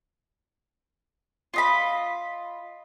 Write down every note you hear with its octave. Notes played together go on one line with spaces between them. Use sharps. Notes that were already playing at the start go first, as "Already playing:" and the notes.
F4 D#5 B5